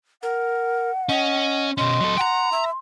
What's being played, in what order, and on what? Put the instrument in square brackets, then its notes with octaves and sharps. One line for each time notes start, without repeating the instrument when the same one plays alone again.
[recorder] A#4 [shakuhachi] F#5
[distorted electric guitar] C#4 [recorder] D#5
[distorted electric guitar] B2 C#4 [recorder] D#5 [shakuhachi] C6
[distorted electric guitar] F#3 A4
[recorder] F#5 [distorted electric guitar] G5 A#5
[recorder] E5